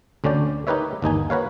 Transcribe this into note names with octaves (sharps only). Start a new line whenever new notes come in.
D2 D3 C#4 D5 G5
D#4 G4 A#4 B4 C#5 E5
G1 D#2 D#4 G#5
F#4 A#4 B4 C#5 F5